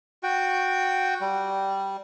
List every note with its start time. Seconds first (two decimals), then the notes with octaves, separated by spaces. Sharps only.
0.23 F#4 G5
1.21 G3